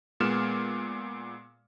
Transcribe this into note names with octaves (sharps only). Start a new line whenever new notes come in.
A#2 G#3 B3 F6 E7